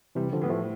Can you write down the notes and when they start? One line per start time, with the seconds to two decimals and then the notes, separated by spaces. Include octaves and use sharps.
0.15 C3 E3 G3
0.33 D3 F3
0.41 A2 B3
0.49 F3 A3